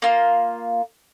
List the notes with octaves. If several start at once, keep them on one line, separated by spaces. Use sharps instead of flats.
A#3 F4